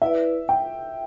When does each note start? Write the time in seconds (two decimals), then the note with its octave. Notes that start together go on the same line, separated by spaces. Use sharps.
0.02 E4 B4 D5 E5
0.49 G5